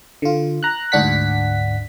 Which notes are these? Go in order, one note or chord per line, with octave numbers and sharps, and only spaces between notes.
D3 F4
A#5 F#6
D2 G#2 D4 F#5 B6